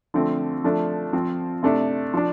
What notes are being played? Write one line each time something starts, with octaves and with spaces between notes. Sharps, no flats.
D3 F3 A3 C4
F3 A3 D4
F3 C4
C3 A3 D4
F3 D4